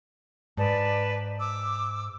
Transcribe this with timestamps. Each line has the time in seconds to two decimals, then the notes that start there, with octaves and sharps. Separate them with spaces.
0.57 G#2 B4 D5 A5
1.39 D6 E6